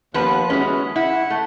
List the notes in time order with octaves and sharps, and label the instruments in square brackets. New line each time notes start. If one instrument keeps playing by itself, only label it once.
[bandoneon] D#2 F#6 [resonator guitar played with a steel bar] F3 B3 B4
[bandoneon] E3 G#3 [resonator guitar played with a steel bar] C#4 F#4
[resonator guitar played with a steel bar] E4 [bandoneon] F#5
[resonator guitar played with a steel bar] A3